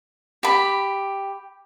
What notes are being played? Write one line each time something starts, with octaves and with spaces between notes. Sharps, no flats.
G4 B5